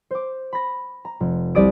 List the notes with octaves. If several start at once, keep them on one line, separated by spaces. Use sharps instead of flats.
C5 D6
B5 A#6
A#5
F1
C2 G4 D5 D#6 D7